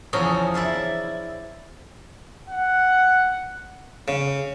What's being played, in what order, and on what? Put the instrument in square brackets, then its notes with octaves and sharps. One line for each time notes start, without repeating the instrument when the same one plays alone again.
[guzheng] E2 C#3 F3 C#4 G#4 A#5
E4 D5 E5 F5
[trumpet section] F#5
[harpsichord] C#3